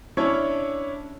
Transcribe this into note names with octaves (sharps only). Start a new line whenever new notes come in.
C#4 D4 E4 C#5